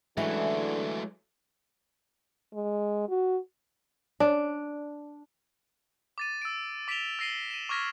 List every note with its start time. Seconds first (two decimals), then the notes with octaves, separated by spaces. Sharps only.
0.17 D3 E3 F#3 G#3 A3 C#4 E4 G#5
2.54 G#3
3.09 F#4
4.20 D4
6.18 D6 A6 D#7
6.42 E6 D7
6.88 D6 B6 D7 E7 F7 G7
7.19 E6 A#6 C7 D#7 G7
7.50 D#7 E7
7.69 C#6 D6 F6 G#6 A#6 B6